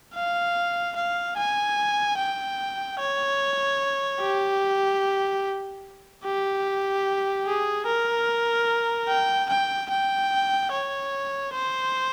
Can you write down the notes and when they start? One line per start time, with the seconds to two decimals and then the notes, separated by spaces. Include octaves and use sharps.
0.15 F5
0.96 F5
1.36 G#5
2.18 G5
2.99 C#5
4.21 G4
6.24 G4
7.46 G#4
7.86 A#4
9.08 G5
9.49 G5
9.90 G5
10.71 C#5
11.53 C5